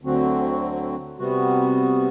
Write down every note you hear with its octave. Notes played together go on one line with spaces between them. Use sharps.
D2 D3 F#3 C4 F#4
C3 G3 B3 F#4